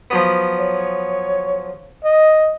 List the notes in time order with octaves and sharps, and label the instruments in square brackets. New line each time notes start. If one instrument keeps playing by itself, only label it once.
[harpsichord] F3 F#3 B3
[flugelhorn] C#5
D#5